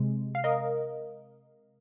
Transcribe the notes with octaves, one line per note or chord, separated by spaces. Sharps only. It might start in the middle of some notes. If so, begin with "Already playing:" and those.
Already playing: C3 G#3
F5
A#4 D#5